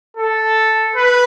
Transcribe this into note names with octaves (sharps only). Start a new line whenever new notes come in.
A4
B4